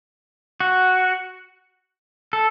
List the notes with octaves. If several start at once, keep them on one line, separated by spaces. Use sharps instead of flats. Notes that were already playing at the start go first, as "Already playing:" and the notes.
F#4
A4